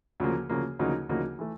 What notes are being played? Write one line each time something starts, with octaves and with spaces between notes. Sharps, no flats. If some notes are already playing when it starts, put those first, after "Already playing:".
D2 C#3 F3 A#3
D2 C#3 F3 A#3
D2 C#3 F3 A#3 D#4
D2 C#3 F3 A#3 D#4
E3 A3